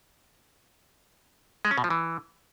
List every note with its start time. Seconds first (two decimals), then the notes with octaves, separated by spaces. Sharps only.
1.65 G#3
1.71 C#4
1.78 B2
1.84 F3
1.90 E3